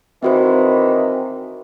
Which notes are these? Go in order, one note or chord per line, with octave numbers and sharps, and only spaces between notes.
D#3 E3 C4 F#4 C5